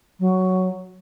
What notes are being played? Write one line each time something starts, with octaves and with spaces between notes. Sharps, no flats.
F#3